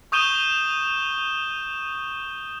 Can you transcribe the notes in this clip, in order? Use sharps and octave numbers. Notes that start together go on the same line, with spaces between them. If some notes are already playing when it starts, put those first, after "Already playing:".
C#6 D#6 G6 D#7 E7 G7